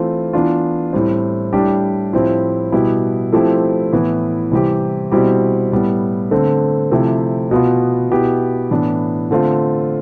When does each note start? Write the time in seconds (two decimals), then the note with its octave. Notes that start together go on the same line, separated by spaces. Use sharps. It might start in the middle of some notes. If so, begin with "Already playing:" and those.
Already playing: E3 A3 C4 F4
0.33 E3 B3 D4 F4
0.93 A2 G3 C4
1.53 A2 G3 D4 G4
2.13 A2 F3 C4 E4 G4
2.72 B2 G3 B3 E4 G4
3.33 F3 A3 C4 E4 G4
3.93 A2 E3 B3 E4
4.52 C3 E3 G3 C4 G4
5.12 B2 G3 C4 E4 G4
5.72 A2 G3 B3
6.31 D3 A3 C4
6.91 C3 F3 A3 E4 G4
7.51 B2 B3 F4
8.11 B2 B3 E4 G4
8.71 A2 E3 B3 D4
9.31 D3 A3 C4 F4